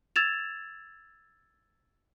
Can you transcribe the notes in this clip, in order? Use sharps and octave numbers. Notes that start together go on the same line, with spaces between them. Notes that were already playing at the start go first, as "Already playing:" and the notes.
E6 G#6 A6 E7 F7